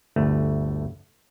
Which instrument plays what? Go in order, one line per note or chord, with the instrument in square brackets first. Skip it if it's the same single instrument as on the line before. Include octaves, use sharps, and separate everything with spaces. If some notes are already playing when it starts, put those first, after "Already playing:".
[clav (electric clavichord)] G1 D2 A3